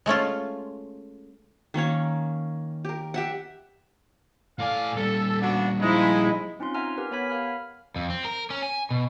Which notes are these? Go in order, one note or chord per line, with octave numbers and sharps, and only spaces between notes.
G#3 A3 C#4 F4
D#3 A#3 C#4 C#5
G4 A#4
G4 E5 F#5
A2 A4 D5 F5 G#5
A#2 G3 A4
F3 B3 D4 F#4
F3 G#3 D#4 E4
C4 C#4 D#4 F4 C6
E5 F#5 G#5 A#5 F6
G4 A#4 B4 F#5
B3 C#5 F#5 G#5 B5 B6
A#4 F5 B5 F6
F2
C4
A#4
C#4
G#5
B2